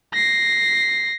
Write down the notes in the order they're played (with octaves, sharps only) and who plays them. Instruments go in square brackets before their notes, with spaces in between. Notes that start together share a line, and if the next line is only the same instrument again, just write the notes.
[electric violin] A#6 C7